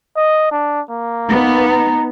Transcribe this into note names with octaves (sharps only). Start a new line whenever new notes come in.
D#5
D4
A#3
B3 D#4
A#5